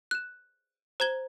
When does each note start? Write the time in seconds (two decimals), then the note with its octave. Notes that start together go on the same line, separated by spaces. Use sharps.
0.11 F#6 E7
1.00 C5 A#5 G#6 G7